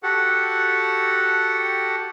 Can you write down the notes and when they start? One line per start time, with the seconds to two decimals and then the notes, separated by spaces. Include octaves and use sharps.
0.03 F#4 G4 A4 F#5